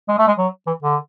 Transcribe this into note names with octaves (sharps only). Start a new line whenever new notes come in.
G#3
A3
G#3
F#3
E3
D3